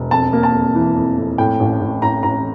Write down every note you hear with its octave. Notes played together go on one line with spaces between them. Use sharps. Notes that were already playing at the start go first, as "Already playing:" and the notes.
Already playing: E1
F2 A5
A#3
A5
F2
E3
F2
F2
A2 G5
A1
A1
A1 A#5
A1 A#5